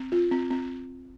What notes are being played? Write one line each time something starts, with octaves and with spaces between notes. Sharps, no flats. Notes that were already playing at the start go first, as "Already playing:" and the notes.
Already playing: C4
F4
C4
C4